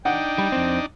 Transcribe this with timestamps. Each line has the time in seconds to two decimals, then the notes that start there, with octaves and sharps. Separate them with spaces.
0.05 D4 D#4 F#5 G5
0.38 G3
0.52 F2 C4